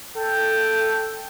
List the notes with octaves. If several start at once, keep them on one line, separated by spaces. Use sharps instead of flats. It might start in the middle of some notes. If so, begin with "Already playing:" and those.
A4 G5